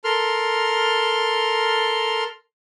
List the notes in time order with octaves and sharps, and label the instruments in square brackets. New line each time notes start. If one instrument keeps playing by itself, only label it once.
[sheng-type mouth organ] A4 A#4 C6 F6